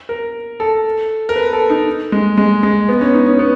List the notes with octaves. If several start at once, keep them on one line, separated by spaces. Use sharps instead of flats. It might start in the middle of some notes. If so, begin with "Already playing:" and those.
A#4
A4
A#4
B4
A4
D#4
G#3
G#3
G#3
B3
C#4
D#4
C#4
B3